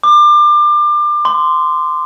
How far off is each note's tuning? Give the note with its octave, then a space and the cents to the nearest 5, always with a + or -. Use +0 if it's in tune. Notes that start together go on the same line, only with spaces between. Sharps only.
D6 +30
C6 -15